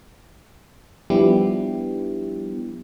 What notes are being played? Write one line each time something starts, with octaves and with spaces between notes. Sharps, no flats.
F3 G3 B3 D4 E4 G4